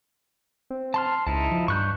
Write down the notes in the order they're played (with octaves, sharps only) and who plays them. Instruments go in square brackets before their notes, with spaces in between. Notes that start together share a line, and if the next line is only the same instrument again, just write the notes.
[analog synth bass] C4
[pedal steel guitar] A5 C6 F6
[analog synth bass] C#2 [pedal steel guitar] D#4 E4 A5
[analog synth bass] F3
[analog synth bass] G2 [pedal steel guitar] C#6 F#6 G6